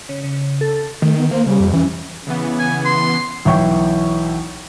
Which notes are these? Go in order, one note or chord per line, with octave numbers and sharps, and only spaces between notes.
C#3
C#3
A4
D#3 A3
B3
A#3 C5
C#3 G3
F2
E3 C#4
C#3 E3 B3
G#5
C6
B1 E3 E4 G5 C#6